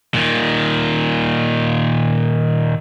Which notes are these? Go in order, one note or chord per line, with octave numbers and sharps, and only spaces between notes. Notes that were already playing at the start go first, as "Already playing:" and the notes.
A#2 D#3